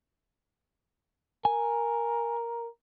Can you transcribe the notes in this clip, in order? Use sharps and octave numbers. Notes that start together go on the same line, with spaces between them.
A#4 G#5